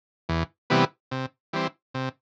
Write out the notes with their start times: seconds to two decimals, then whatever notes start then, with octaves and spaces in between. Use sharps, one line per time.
0.29 E2
0.70 C3 E3 G3 B3
1.11 C3
1.53 E3 G3 C4
1.94 C3